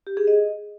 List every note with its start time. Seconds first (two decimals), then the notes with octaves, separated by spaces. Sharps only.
0.07 G4
0.17 G#4
0.27 D#5